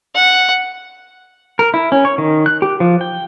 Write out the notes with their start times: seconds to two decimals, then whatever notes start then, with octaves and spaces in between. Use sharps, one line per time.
0.15 F#5
1.59 A#4
1.74 E4
1.92 C#4
2.05 C#5
2.18 D#3
2.46 F#6
2.62 G4
2.80 F3
3.01 G5